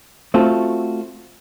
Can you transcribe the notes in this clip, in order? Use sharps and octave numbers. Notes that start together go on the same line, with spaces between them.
A3 C4 F4 F#4 A4